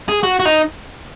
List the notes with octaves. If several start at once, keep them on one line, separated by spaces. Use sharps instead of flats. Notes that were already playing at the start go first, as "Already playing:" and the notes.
G#4
F#4
F#4
D#4